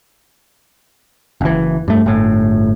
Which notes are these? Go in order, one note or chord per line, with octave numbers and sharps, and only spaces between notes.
F#1 E3
G2 A3
G1 A2